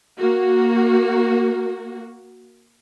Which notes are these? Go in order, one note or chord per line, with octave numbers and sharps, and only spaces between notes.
A#3 F#4